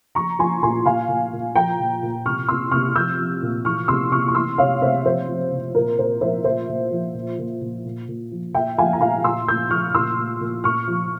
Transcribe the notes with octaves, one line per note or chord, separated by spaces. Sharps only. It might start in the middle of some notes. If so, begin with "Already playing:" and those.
F3 A#5 C#6
F3 G#5 C6
A#2 G#5 C6
A#2 F5 G#5
A#2
A#2
F3 G5 A#5
A#2
A#2
C3 C#6 F6
C3 C6 E6
C3 C#6 F6
F3 E6 G6
F3
A#2
E3 C#6 F6
C3 C6 E6
C3 C#6 F6
C#6
E3 C6 E6
C3 C#5 F5
C3 C5 E5
F3 C5
F3
C3
A#2 A#4
A#2 C5
F3 C5 E5
A#2 C5 E5
A#2
F3
A#2
A#2
A#2
A#2
A#2
F3
A#2 E5 G5
F3 F5 G#5
A#5
A#2 F5 G#5
A#2 C6 E6
A#2 E6 G6
F3 C#6 F6
A#2 C6 E6
A#2
A#2
A#2 C#6 F6
F3